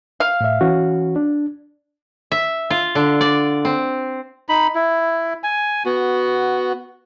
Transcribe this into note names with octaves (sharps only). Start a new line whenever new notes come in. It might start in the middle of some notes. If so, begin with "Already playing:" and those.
F5
A2 E5
E3 C#4 F#4
D4
E5
F4
D3
D5
C4
D#4 B5
E4
G#5
B3 F#4